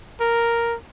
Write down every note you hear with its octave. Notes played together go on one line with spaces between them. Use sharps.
A#4